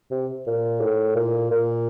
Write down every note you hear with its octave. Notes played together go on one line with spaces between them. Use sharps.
C3
A#2
A2
A#2
A#2